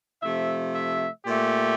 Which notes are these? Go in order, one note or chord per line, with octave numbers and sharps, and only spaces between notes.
C3 F3 A3 E5
E5
A#2 A3 G4